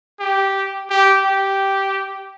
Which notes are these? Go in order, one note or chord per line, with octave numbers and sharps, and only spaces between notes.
G4
G4
G4